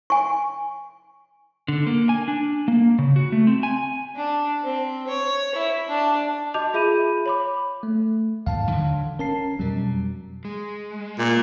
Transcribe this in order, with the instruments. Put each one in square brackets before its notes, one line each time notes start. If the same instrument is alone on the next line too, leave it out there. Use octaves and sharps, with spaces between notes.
[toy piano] G#5 C#6
[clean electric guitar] D3
A#3
G#5
D4
A#3
C#3
F#4
A3
C4
G#5
[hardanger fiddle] D4
C4
C#5
E4
D4
[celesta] F#4 D#5 A5 D6 G6 F7
F4 G#4 E5 B5 G6 D#7
C#5 B5 D6
[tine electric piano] A3
[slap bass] D#2 G#2 [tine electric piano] F5 A5
[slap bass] D3 E3 F#3
[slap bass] C#4 [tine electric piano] A#4 A5 C7
[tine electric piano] F2 B2 [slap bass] F#3 G3
[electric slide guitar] G#3
[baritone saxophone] A#2